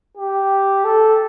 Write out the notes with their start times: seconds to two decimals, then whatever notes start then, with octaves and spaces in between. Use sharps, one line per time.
0.17 G4
0.84 A4